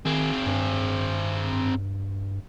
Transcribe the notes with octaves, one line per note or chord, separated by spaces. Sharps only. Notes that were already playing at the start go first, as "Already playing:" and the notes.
D#3 C4 G#4
G2